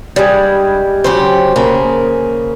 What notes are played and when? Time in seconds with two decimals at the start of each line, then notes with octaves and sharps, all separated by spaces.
0.16 G2 G3 G#3
1.04 C#3 F#3 G4 C5
1.56 C#3 A#3 G#4